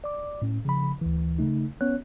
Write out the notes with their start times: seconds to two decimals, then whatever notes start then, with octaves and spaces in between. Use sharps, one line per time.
0.04 D5 D6
0.42 A2 C#4
0.65 C#3 F3 B5
1.01 D2 E3
1.39 C#3 A3 D#4
1.81 B3 C#4 C#5 F#6